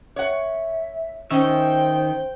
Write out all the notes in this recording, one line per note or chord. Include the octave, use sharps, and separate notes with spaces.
C#5 E5 F#5
D#3 C#4 D#4 C5 E5 G5